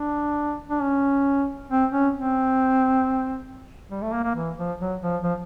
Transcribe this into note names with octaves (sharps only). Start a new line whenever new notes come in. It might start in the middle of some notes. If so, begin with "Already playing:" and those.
Already playing: D4
D4
C#4
C4
C#4
C4
G3
A3
A#3
A#3
E3
F3
F#3
F3
F3